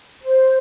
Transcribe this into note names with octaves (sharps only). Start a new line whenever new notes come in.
C5